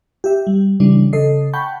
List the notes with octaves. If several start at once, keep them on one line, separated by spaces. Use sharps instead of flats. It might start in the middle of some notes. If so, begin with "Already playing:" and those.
G4 E5
G3
C#3 E3 G3 D4
C#3 A4 D#5 C7
F#5 G5 A5 B5 C#6 G6